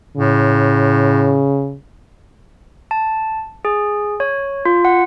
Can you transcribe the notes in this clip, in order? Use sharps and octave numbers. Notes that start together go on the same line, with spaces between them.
A2 C#3
A5
G#4
C#5
F4
F#5